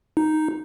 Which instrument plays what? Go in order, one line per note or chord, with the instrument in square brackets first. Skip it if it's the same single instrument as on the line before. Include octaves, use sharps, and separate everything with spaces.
[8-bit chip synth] D#4